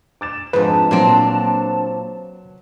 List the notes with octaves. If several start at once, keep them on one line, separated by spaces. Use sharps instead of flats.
D6 A6 E7
F2 G#2 F3 D4 B4 A5
A#2 F#3 A#3 C4